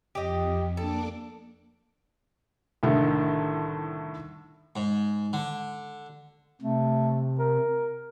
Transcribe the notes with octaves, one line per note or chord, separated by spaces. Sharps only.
F2 G4 D#5
A#3 D4 A4 D6
C2 A2 D3 D#3 A3
G#2
D3
C3 A3
A#4